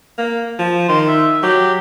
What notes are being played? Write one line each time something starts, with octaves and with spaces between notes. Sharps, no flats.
A#3
F3
D#3 C6
E5
F#3 G4